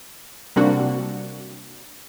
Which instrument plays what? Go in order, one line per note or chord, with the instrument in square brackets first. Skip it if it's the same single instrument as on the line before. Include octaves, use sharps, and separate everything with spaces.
[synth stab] C3 G3 A#3 C4 D4 F#4